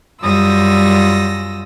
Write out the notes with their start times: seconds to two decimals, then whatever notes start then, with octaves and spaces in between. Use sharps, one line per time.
0.22 F#2 G3 F4 D#6 E6 A#6